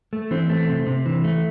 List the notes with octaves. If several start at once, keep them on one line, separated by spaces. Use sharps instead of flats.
A3
E3 C4
A3
C3
C3
E3
A3